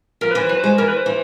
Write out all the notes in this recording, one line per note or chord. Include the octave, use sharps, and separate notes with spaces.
F3 A#4
E3 B4
C5
F#3 B4
G#3 C5
E3 A#4
B4
C5
E3